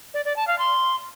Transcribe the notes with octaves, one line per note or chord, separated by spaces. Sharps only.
D5
D5
A5
F5
C6